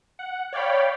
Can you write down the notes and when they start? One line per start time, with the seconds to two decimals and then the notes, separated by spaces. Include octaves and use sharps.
0.19 F#5
0.53 C#5 D5 F5 G5 B5